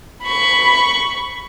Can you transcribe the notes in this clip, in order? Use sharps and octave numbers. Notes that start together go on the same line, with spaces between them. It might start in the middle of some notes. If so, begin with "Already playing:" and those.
B5 C#6